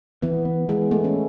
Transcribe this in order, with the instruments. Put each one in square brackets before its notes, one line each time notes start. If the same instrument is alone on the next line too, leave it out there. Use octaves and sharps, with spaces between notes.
[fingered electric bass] E3 [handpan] B3
[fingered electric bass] B3
[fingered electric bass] E3 [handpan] G#3
[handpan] A3 [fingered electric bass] B3
[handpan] C#4